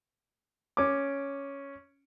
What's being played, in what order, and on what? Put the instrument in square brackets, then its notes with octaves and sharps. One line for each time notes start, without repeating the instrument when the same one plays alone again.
[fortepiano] C#4 D6